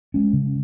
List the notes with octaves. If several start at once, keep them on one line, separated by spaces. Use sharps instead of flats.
G#3 C#4
C#3